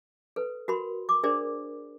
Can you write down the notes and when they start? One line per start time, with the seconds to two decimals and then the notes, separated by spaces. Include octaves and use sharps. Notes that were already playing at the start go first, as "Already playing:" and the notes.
0.36 A4 B4
0.68 F#4 A#4 B5 C6
1.09 D6
1.23 D4 G#4 A#4 C5 D5